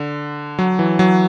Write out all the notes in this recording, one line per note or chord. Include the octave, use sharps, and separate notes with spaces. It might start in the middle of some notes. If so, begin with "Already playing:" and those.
Already playing: D3
F#3
E3
F#3